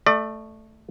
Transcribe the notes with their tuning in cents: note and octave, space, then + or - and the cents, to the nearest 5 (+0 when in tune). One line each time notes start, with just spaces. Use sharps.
A3 +0 D5 +35